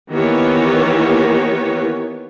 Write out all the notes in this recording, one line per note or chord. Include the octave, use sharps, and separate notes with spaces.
D#3 E3 A#3 B3 G4 C#5